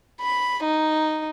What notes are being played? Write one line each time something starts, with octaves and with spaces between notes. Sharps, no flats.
B5
D#4